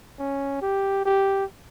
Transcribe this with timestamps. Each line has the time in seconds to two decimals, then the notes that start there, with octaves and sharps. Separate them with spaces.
0.19 C#4
0.61 G4
1.05 G4